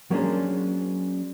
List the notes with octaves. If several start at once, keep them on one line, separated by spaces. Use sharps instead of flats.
F#3 A#3 C#4 D4 G#4 C5